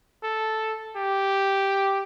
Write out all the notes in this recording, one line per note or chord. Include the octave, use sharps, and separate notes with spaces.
A4
G4